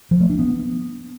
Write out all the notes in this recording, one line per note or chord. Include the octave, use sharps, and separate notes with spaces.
F3
A3
D4
B3